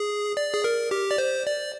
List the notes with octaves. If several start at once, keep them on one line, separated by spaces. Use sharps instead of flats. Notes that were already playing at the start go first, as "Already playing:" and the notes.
Already playing: G#4
D5
G#4
A#4
G4
D5
C5
D5